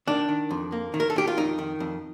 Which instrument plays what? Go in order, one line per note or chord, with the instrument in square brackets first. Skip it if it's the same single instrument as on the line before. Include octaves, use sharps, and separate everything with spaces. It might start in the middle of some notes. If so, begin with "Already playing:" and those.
[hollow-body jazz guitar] D#3 D4
D#3
F2
A#3
D#3
A#4
A4
D#3 G4
F4
F2 D#4
D#3
F2